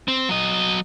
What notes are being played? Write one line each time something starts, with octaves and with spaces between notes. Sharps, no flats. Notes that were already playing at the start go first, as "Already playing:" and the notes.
C4
F#3 D#5